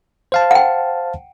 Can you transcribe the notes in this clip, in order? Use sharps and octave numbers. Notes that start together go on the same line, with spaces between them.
C5 F5 A5
F#5 G5